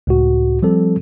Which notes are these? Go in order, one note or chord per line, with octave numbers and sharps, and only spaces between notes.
C#2 A2 F#4
F3 G3 C4 A4